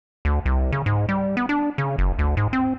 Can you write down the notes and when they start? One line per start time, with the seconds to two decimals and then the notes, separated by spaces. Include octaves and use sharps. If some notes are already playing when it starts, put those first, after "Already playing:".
0.25 D2
0.46 C2
0.72 C#3
0.86 G#2
1.09 G3
1.37 B3
1.49 D4
1.78 C#3
1.98 F#1
2.19 D2
2.37 G#2
2.53 C4